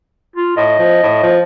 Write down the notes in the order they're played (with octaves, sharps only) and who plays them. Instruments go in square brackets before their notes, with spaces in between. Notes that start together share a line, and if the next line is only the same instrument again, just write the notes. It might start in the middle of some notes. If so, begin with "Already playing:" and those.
[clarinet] F4
[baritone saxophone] A2 [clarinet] D#5
[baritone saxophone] F3
A2
F3